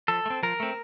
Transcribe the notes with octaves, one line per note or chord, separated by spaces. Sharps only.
F3 A4
A3
C4
F3 A#4
A3 C4